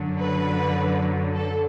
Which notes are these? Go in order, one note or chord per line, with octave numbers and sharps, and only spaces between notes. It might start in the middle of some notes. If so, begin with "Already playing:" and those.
Already playing: F#2 D3 F#3
B4
A4